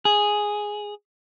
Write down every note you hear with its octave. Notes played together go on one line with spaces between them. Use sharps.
G#4